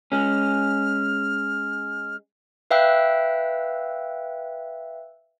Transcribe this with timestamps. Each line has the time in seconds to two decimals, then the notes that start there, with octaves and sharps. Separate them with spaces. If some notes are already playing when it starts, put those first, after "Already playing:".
0.12 G#3 C#4 F6
2.71 B4 E5 F5 G5 E6 F#6